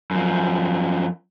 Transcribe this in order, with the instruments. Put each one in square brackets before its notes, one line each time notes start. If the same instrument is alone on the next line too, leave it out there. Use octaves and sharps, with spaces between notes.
[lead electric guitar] F#2 F3